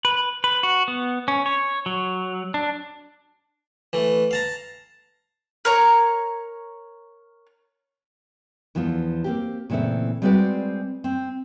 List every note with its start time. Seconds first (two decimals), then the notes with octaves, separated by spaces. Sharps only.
0.05 B4
0.44 B4
0.63 F#4
0.88 B3
1.28 C#4
1.46 C#5
1.86 F#3
2.54 D4
3.93 E3 A3
4.31 F5 A5 A#5
5.65 A#4 C#5 A#5 C#6
8.75 E2 E3 F3 B3 F4
9.24 A#3 C4 G4
9.70 A#2 C#3 E3 A3 C4 E4
10.22 G3 G#3 C4 F#4 B4 D5
11.04 C4